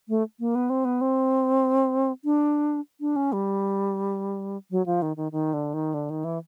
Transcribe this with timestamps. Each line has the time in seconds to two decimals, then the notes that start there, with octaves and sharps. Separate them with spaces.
0.09 A3
0.40 A#3
0.55 B3
0.70 C4
0.85 B3
1.01 C4
2.25 D4
3.01 D4
3.16 C#4
3.33 G3
4.71 F#3
4.86 F3
5.02 D#3
5.17 D#3
5.32 D#3
5.54 D3
5.74 D#3
5.94 D3
6.10 D#3
6.24 E3